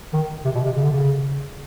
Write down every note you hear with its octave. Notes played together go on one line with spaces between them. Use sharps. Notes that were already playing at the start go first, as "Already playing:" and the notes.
D#3
C3
B2
C3
C#3
D3
C#3